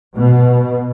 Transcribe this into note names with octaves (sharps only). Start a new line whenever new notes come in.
B2